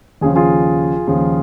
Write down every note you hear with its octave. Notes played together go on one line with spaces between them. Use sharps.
D#2 C#3 F3 G#4
F4 G#4
D#2 C#3 F3